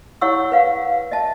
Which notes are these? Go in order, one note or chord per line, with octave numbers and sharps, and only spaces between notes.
E4 C#5 F#5 C#6 E6
B4 F5 F#5
D#5 E5 A5